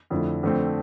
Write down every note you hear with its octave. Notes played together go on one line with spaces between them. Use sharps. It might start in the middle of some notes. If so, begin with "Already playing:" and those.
F2 D3 A3 E4
F2 D3 A3 C4